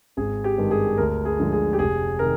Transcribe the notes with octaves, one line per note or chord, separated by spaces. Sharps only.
G#1 G#4
G4
G2 D#3 G#3
G#4
D2 A#4
G#4
D3 F3 G#3
G#4
G4
F1 G#4
C3 D#3 A#4